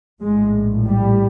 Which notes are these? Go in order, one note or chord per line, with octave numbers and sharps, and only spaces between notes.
A#1 A2 G#3
G3